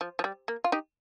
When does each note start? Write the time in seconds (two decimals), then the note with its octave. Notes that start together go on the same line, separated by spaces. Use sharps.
0.01 F3
0.19 F3
0.24 G3
0.48 A#3
0.64 F4
0.72 D#4 G4